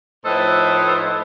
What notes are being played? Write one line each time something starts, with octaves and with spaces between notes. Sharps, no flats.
A2 F3 D#4 A4 B4 C5